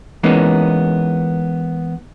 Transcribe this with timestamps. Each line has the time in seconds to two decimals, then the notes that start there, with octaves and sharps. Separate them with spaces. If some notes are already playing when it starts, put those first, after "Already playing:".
0.23 E3 G#3 A#3 B3 C#4 D#4